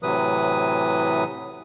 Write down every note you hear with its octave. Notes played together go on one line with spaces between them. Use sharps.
A2 C3 E3 F#3 B4 D#6